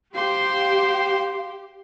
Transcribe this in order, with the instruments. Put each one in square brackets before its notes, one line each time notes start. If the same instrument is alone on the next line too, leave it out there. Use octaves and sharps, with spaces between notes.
[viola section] G4 [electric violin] C5 C6 [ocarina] F5